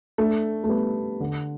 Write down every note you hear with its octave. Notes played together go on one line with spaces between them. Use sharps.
A3 D4
A3
G3 B3
D3